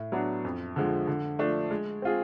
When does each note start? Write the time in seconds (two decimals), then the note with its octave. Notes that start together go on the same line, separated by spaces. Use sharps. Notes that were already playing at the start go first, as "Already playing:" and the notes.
Already playing: A2
0.12 F#3 B3 D4
0.45 F2
0.76 D3 F3 G#3
1.07 D3
1.39 F3 A3 D4
1.71 G#3
2.02 C4 F4 G#4